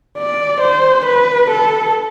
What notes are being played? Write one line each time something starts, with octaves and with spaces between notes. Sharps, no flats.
D5
C5
B4
A4